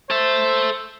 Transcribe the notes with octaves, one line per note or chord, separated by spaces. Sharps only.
A4 C5 E5